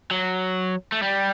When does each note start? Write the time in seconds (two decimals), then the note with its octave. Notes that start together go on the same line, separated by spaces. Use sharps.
0.11 F#3
0.92 A3
1.02 G3